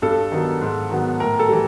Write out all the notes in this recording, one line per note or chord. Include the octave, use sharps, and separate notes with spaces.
G2 A4
D#3 F#3 B3
G#2
D#3 F#3 B3
A2 A#4
A4
E3 G3